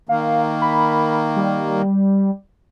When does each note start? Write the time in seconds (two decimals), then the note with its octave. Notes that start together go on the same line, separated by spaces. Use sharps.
0.09 D#3 A#3 F5
0.62 B5
1.36 G3